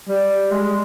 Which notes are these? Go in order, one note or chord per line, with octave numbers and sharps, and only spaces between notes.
G3
G#3